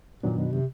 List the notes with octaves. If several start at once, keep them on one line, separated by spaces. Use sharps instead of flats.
F#2 A#2 D#3 F#3 B3 D4
B2
C3